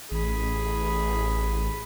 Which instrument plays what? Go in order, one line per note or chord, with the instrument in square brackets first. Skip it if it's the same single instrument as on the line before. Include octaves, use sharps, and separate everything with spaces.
[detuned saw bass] A1 [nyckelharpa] G#4 B5